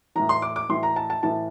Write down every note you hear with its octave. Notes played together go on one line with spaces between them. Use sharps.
A2 E3 A#5
C6
D6
D6
A2 E3 C6
A#5
A5
A5
A2 E3 A5